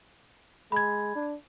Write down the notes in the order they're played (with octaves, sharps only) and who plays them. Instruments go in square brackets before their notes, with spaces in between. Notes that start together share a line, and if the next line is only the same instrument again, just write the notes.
[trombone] G#3 [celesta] B5 G#6
[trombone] D4